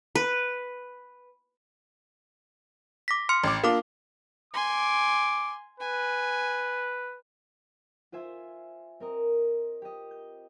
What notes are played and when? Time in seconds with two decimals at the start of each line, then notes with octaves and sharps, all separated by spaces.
0.15 B4
3.08 D6 A#6 B6
3.29 C6 F6 C#7
3.44 A1 D6
3.64 A#3 D4 F4 A#4 D6
4.54 G#5 C6 D6
5.80 B4 G#5
8.12 F4 C5 E5 G#5
9.00 C4 A#4 D#5
9.82 G4 D#5
10.11 G6